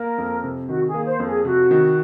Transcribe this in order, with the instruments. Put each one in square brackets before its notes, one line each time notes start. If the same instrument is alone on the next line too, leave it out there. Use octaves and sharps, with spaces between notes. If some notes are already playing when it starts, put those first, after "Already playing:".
Already playing: [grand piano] A#3 [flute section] A#4
[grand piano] F2
C3
[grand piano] D#3 [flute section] F#4
[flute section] G#4
[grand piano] A#3
[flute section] C5
[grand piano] F2
[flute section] G#4
[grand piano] C3 [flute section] F#4
[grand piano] D#3